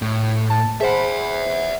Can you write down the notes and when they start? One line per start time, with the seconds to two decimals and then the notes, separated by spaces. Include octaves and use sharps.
0.02 A2
0.50 A5
0.81 G#4 C5 E5 F#5 B5